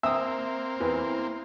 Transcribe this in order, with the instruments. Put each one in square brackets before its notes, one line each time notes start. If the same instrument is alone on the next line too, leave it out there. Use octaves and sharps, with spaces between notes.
[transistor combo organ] A#3 C4 [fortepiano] E5 D#6
[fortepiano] E2 E3